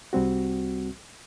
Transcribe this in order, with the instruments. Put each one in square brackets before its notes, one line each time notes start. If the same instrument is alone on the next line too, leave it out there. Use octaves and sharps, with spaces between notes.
[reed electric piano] C2 G3 C4 F#4